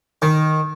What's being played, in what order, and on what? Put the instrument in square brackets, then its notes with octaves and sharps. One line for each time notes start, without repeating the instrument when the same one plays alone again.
[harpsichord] D#3